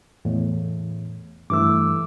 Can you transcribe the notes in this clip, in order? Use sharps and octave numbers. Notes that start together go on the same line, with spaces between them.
E2 A2
G2 E3 A3 D6 E6